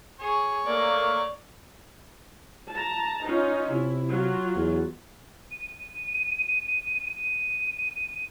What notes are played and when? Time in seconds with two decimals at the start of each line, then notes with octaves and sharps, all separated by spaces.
0.20 G#4 C#5
0.66 A3 A#3 D5
2.70 A5 A#5
3.25 C#4 D#4 F4
3.70 C3 E4
4.10 F#3 F4 F#4
4.56 E2
5.51 D#7
7.16 D#7